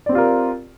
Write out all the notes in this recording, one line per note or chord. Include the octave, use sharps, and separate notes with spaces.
C4 F4 G4 A#4 D5